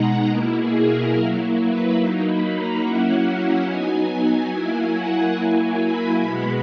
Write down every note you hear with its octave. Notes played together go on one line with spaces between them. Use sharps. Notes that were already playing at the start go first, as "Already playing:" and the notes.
Already playing: B2 G#3 D#4 F#5 A#5
B2 A#3 E4 A#4
G#4
A#4
F#3 A#3 E4 A#4
B4
F#3 A#3 D#4 E5
B5
A#5
F#3 A#3 C#4 E4 F#5
F#3 B3 D#4 G#5
G#5
F#3 A#3 E4 G#5
F#5
F#3 A#3 E4 G#5
B5
B2 G#3 B3